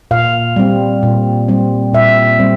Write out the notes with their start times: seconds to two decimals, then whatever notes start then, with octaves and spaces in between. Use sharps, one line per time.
0.11 A#2 F5
0.56 G3 C4
1.03 A#2
1.48 G3 C4
1.93 A#2 E5
2.39 G3 C4